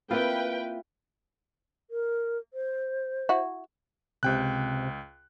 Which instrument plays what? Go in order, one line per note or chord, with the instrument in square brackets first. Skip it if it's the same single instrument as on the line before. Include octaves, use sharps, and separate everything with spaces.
[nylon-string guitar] A#3 C4 [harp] E4 F4 [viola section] B4 G5
[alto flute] A#4
C5
[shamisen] E4 F#4
[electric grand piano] C#2 G5 F#6 [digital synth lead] C3